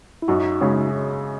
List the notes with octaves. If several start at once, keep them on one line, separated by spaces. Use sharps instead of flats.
E4
F#2 D#4 F#4
C#3 G#3 C#4